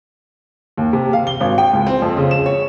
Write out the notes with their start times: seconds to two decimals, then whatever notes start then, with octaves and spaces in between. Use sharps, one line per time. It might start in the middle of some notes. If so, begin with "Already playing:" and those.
0.77 D#2
0.93 C3
1.13 F5
1.27 G7
1.40 G#1
1.58 G5
1.73 C#2
1.87 C4
2.02 F2
2.17 C#3
2.31 E7
2.46 C#5